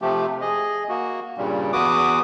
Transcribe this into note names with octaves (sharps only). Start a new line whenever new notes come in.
C3 F3 A3 G4
G#4 D#5
A#3 F#4
G2 A#2 C#3 G3
E2 F#4 B4 D6 D#6